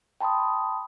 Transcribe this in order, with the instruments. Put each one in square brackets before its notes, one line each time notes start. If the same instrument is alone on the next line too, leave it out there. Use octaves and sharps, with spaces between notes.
[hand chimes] G5 A5 B5 C6 D#6